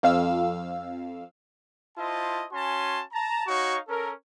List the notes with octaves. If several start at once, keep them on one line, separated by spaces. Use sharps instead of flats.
F2 F5 E6
E4 F4 C5 D#5 A5
C#4 F#4 G#5 A5 C6
A5 A#5
D#4 F#4 C#5 F5 C#6
C#4 A4 A#4